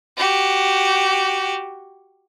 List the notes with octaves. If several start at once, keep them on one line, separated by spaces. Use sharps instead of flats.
F#4 G4